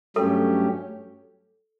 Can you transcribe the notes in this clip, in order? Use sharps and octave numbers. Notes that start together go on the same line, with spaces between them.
G2 F#3 A3 C#4 G4 A4